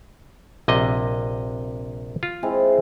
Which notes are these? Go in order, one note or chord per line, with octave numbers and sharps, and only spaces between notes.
A#1 C3 D#5
F4
G#3 C4 E4